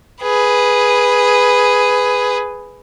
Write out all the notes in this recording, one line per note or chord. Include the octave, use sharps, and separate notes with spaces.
G#4 B4